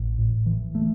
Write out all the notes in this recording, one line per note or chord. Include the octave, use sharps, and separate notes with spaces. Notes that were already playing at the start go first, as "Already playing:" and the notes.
Already playing: A1
A2
E3
A3